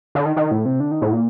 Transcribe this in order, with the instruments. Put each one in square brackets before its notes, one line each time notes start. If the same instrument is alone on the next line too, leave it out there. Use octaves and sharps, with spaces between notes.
[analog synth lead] D3
D#3
D#3
A2
C3
D3
D#3
A2
A#2